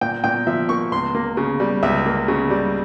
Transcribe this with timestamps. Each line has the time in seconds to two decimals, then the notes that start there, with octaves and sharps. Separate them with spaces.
0.01 A#2 G5
0.24 A#2 G5
0.47 F3 E5
0.69 A#3 C#6
0.92 C#2 C6
1.15 A#3
1.37 C#3
1.60 G3
1.83 C#2 E5
2.06 A#3
2.28 C#3
2.50 G3